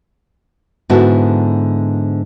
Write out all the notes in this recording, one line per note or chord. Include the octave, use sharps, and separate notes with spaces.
G#2 D3 B3 E4 F#4 A5